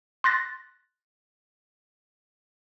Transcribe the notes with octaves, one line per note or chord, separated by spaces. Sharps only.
C6 F#6 A6 A#6